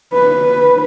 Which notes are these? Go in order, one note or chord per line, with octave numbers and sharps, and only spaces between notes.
B4